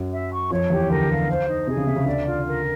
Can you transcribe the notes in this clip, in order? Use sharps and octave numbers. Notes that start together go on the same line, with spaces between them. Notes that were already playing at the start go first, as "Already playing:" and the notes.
Already playing: F#2 F#3
E5
C#6
F2 F3 C#5
E2 E3 G4
D2 D3 A#4
F5
C5
D#4
C3 G#4
C#3
C3 E5
C#3
D2 D3 D5
F4
A#4